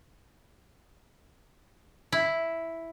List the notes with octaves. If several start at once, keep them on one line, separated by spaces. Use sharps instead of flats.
E4